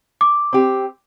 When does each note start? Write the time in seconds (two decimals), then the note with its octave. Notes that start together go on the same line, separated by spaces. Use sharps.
0.21 D6
0.53 C4 G4